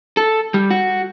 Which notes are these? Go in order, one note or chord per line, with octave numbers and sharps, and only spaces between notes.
A4
G3
F#4